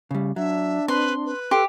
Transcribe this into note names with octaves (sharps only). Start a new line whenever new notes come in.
C#3 G3
F#3 D4 E5
C4 B4 C6
B4
G4 A4 C6